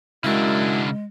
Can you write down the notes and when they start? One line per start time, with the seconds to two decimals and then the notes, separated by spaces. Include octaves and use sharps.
0.24 F#2 C#3 G#3 D4 E4